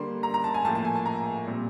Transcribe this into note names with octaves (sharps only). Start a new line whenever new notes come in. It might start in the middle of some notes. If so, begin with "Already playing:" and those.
Already playing: D3 G3 A#3 C6
A#5
A#5
A5
G#5
A2 F3 A#3 A5
A5
G#5
A5
A#5
A#2 G3 C4